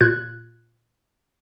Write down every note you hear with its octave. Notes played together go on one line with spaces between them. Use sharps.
A#2 F4 F#6 G#6